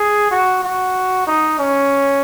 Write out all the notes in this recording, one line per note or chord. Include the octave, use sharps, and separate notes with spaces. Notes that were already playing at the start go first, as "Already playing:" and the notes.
Already playing: G#4
F#4
F#4
D#4
C#4